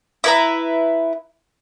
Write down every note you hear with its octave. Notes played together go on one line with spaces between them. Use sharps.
E4 B4 A#5